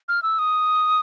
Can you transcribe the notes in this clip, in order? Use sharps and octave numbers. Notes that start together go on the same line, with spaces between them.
F6
E6
D#6